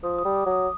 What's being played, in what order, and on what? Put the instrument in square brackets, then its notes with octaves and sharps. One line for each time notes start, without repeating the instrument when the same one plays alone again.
[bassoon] F3 [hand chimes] D#6
[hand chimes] D#6
[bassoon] G3
[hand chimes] D6
[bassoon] F#3
[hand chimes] D#6